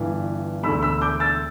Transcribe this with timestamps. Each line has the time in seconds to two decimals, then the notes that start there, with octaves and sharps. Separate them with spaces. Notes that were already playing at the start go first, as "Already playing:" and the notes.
Already playing: G1 G2 E3
0.63 E1 D2 D3 B5 E6
0.82 B5 E6
1.01 D6 G6
1.20 E6 A6